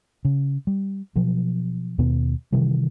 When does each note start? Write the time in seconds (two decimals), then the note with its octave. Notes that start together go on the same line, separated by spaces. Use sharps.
0.25 C#3
0.67 G3
1.16 B2 F3 F#3
1.99 D#2 B2 B3
2.53 C3 D#3 E3 G3